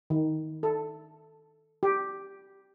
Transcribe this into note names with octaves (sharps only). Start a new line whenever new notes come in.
D#3
A4
G4